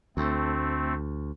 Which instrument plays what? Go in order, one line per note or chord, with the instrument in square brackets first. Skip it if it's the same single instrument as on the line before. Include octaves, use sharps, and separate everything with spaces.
[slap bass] D2 [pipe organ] A3 C4